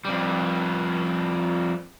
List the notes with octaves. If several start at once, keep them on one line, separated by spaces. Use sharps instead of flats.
F2 G3